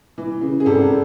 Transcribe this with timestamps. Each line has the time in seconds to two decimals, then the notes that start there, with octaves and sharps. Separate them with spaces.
0.18 E3
0.41 C#3
0.60 G#4
0.66 G#1 A4